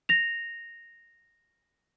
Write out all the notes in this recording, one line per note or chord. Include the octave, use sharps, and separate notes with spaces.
A#6 F7